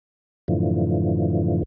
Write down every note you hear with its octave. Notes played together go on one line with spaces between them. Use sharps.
F#2 A2 D3 E3 F3